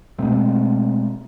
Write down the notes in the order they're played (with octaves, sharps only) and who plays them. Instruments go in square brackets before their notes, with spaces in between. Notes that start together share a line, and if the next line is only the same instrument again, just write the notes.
[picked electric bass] B2 G#3 A3 C4